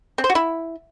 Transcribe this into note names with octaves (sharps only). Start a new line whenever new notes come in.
C4
C5
F#4
E4